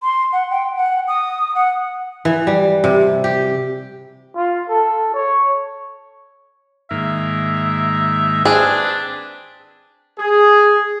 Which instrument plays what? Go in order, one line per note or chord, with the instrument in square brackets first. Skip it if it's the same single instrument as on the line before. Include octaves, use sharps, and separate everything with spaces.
[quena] C6
F#5
G5
F#5
D#6
F#5
[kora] E3
G3
C3
G4
[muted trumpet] F4
A4
C#5
[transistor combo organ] G#2 D#3 A#3 [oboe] E5
[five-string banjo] C4 G#4 [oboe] D4 [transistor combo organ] B4 D5 A5
[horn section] G#4